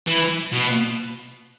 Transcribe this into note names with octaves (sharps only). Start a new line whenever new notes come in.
E3
B2